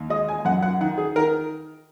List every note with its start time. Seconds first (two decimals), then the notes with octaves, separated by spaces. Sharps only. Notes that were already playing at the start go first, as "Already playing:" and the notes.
Already playing: D#2
0.10 G#3 D#5
0.28 G#5
0.45 F#2 F#5
0.62 F#5
0.80 D#3 F#5
0.98 G#4
1.16 D#3 A#4